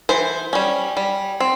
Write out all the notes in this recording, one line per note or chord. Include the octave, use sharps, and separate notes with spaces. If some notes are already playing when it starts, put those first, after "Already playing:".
E3 C5
G3 C#4
G3
C4